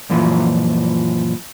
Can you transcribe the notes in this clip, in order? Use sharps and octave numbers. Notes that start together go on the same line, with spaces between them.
F#2 A#2 E3 F3